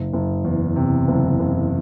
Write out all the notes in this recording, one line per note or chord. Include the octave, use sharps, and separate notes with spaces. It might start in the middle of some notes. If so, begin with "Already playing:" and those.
Already playing: F#1
F#1
E2
C3
F#1
F#1